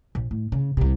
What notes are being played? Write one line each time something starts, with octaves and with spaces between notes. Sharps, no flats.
A#1
A2
C#3
C2 C3